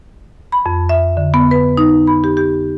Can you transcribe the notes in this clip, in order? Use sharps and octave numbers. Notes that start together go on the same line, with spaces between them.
B5
F2
E5
D3
B3
B4
D#4
B5
G4
G4